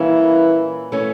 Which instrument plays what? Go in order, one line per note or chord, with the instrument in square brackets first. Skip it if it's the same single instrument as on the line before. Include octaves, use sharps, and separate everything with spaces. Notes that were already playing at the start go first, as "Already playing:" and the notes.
Already playing: [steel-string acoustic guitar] A#2 G3 A#3 C#4 E4 [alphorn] E3
[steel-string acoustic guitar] E3 A3 C#4